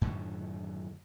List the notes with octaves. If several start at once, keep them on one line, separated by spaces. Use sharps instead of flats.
F#2 A2 D3 D#3